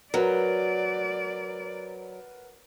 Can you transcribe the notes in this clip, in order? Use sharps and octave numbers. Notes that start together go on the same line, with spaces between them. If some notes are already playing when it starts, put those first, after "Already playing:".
F#3 A#4 B4 D5 F#5